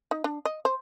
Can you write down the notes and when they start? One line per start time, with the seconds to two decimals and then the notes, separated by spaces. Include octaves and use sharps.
0.11 D#4
0.24 D4
0.45 D#5
0.65 C5